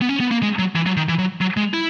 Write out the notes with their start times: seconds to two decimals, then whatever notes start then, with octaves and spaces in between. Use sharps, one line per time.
0.02 B3
0.09 C#4
0.21 B3
0.31 A#3
0.43 G#3
0.59 F#3
0.76 E3
0.86 F#3
0.97 D#3
1.09 E3
1.19 F#3
1.41 F#3
1.57 G#3
1.74 E4